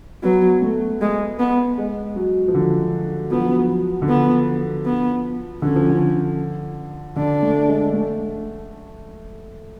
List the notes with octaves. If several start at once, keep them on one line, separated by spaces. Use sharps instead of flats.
F#3 B3
A3
G#3
B3
G#3
F#3
F3
D3
F3 B3
F#3
F3
F#3
D3
F3 B3
B3
D3 C#4
F3
D3
D3 D4
A3
G#3
A3